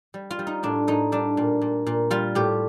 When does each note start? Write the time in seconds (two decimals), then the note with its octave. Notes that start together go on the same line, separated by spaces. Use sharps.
0.14 G3
0.31 F4
0.39 G3
0.47 D#4
0.63 A2 D4
0.88 A2 D#4
1.12 G3 D4
1.37 A#2
1.61 A#2
1.86 A#2
2.11 G3 F4
2.35 A2 G4